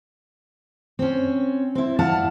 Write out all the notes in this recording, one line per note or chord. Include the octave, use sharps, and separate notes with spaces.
C4 C#4
C4 E4
E4 D5 F5 F#5 A5